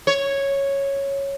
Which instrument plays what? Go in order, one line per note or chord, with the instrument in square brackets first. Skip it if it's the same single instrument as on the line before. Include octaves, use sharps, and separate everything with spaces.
[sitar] C#5